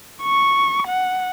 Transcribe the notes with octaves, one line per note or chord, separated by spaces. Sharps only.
C#6
F#5